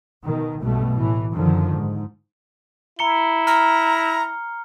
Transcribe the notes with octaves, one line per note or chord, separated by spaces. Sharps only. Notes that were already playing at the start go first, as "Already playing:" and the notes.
B2 D#3
B1 G2 B2 A3
A2 E3
F#2 D3 D#3 F3
G#2
E4 A#5 C#7 G7
A#5 F6